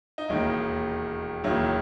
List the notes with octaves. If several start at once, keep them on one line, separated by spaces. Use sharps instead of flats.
D#4
E1 D#2 D#3 E4
E1 D#2 D#3 F#3 E4